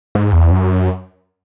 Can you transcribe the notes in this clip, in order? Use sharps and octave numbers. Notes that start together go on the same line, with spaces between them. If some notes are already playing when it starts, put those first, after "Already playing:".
G#2
E2
F#2